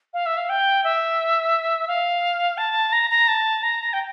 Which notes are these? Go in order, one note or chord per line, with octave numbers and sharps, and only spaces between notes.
F5
E5
F5
G5
E5
F5
A5
A#5
A#5
A5
A#5
G5